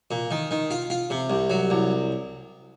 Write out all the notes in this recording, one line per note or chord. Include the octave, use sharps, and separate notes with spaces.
A#2
D#3
D#3
F4
F4
C3
C2
F#3
C2